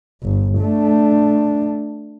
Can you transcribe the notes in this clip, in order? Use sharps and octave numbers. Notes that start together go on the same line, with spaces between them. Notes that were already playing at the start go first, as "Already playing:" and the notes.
G1
A3 D4